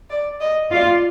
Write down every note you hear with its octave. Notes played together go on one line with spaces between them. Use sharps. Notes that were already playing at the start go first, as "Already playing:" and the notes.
D5
D#5
F4 D5